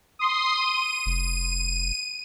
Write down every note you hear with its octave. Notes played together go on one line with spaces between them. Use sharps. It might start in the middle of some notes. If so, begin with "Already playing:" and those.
C6 D#6
D#7
F1